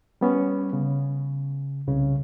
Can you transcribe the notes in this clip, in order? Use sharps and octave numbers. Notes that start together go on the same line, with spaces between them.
G3 B3 C#4
C#3
C2 C#3